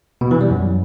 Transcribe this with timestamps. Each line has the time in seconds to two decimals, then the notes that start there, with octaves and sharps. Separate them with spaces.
0.21 B2
0.31 E3
0.41 G3
0.51 F#2